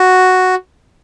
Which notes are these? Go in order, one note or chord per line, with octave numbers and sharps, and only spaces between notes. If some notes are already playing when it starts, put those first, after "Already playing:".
Already playing: F#4